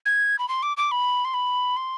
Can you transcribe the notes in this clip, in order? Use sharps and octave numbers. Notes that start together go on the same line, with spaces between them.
G#6
B5
C6
D6
D6
B5
C6
B5
C6